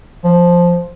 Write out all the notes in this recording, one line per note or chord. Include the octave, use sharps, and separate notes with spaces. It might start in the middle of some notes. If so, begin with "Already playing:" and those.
F3